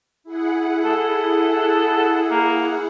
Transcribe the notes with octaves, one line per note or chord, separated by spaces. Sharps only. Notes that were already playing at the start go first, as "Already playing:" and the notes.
E4 G#4 F#5
A4
A#3